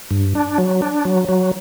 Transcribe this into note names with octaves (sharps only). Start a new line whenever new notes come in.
G2
D4
F#3
D4
F#3
F#3